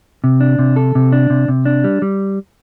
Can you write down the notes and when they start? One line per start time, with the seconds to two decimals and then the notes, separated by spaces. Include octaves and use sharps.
0.24 C3
0.41 D4
0.59 C3
0.76 A4
0.95 C3
1.12 D4
1.30 C3
1.48 C3
1.66 D4
1.84 G3
2.02 G3